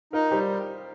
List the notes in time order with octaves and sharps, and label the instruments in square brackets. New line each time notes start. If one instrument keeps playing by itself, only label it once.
[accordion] D#4 [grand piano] F4 A#4
[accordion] G3 [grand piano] G4 C5